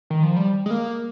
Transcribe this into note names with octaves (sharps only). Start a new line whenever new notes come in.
D#3
F3
G3
G#3
A#3